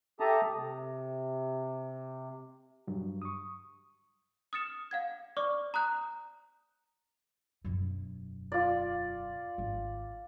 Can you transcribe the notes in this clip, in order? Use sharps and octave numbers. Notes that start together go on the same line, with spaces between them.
G4 A4 E5 A5 A#5 D#6
C3
G2 F#3
C#6 D#6
D#6 F6 A6 C#7 E7
F5 F#5 G#6
C5 D5 C#6 D6 F6
A#5 D#6 F#6 G6
E1 F#2
F4 D5
G#1